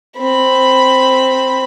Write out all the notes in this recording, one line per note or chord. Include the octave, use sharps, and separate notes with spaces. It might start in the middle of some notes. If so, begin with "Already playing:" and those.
C4 B5